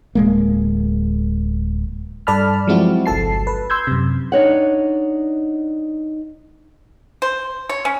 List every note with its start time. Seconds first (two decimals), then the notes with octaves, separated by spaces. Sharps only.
0.15 D1 G#3 A#3
2.27 G2 A4 D5 A5 B5 F6
2.67 F3 F#3 G#3 C4 E4 F#4
3.06 G1 C2 A4 A5 C7
3.47 B4
3.70 C6 E6 G6 G#6
3.87 F#2 C3
4.32 D4 D#4 C#5 F#5
7.22 C5
7.69 C#5
7.85 C#4